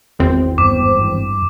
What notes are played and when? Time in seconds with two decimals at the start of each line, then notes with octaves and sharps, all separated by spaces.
0.19 G#1 E2 C4
0.58 G2 D6